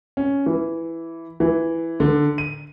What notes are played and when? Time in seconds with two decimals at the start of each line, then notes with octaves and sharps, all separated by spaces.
0.17 C#4
0.46 E3
1.40 E3
2.00 D3
2.38 D#7